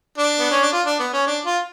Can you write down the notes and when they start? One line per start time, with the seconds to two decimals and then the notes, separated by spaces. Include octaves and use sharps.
0.18 D4
0.40 B3
0.51 C#4
0.62 D4
0.72 F4
0.86 D4
0.99 B3
1.13 C#4
1.27 D4
1.46 F4